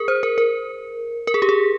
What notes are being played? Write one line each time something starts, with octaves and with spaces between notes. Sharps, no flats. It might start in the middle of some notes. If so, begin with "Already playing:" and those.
Already playing: G#4 A#4
C5
A#4
A#4
A#4
G#4
G4
G#4